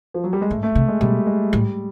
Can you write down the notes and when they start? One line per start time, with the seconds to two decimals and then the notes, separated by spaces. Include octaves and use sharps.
0.14 F3
0.24 F#3
0.33 G3
0.41 G#3
0.51 G#2 A3
0.63 A3
0.75 C3
0.88 G#3
1.01 B2 G3
1.26 G#3
1.52 A2 G3